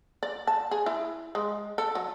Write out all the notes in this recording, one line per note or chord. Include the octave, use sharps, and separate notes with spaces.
D5
A5
G#4
E4
G#3
A4
F#3